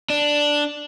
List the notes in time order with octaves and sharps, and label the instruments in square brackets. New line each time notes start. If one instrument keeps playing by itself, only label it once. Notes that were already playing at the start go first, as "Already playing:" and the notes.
[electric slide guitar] D4